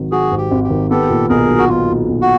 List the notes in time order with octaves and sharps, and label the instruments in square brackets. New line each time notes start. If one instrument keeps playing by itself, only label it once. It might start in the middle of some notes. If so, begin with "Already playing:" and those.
Already playing: [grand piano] G#1 G#2 D#3 F#3
[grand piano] F#3 [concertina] F#4 G#4
[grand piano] G#2
[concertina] G4
[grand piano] G#1
[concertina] G4
[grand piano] D#3
[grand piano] B3 [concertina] G4 A4
[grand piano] A#2
[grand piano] B1 [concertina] G#4 A#4
[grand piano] F#3
[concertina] F#4
[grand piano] B3 [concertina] F4
[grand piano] A#2
B1
[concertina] F#4